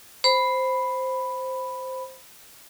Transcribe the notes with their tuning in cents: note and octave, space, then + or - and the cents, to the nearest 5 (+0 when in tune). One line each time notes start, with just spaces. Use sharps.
C5 +0 B5 +0